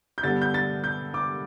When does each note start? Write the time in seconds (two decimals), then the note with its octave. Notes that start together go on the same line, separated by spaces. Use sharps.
0.18 G6
0.23 G2 D3 G3 B3 D4 A6
0.41 G6
0.54 A6
0.84 G6
1.14 D6